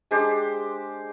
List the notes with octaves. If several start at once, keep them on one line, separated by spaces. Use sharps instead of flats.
G#3 D4 G4 C5